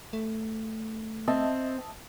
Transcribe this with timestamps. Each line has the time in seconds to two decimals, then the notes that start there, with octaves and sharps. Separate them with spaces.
0.13 A3
1.28 C4 D#5 E5 A5